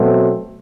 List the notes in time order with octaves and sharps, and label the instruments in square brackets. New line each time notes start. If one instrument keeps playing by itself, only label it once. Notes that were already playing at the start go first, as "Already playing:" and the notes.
Already playing: [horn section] B2 F#3 A3 C4